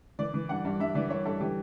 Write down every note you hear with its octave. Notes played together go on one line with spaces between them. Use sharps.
E3 D5
E3
G2 F#5
G2
G2 E5
E3 D5
G2 C#5
G2 A4
E3 G4